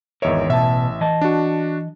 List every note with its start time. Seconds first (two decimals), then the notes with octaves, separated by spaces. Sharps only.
0.22 G#1 E2 A#4 C#5 D#5 E5
0.49 A1 B2 E5 A5
1.01 E3 D#5 A5
1.21 D4 F#4